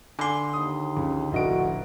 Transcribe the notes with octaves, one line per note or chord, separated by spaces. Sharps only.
D3 G#5 B5 C6 D6
D#2 D#6
C#2
F1 A#1 A2 F#4 D#5 D7